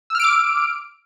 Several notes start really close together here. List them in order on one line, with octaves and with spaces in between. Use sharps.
E6 F6 D7 D6